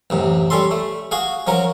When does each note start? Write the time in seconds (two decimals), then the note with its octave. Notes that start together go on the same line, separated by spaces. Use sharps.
0.10 A1 F#2 C3
0.50 G3 C#4 A4 C6
0.71 A3
1.11 F#4 G#4 F5
1.47 F3 F#3 C#4 A#4